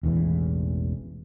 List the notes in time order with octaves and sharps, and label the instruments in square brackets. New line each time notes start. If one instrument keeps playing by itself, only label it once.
[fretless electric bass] E1 A1 E2 E3